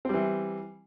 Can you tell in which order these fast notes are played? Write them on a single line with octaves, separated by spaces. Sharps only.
C4 G3 E3